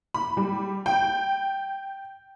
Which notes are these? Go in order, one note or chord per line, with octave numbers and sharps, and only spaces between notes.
B5
G3
G5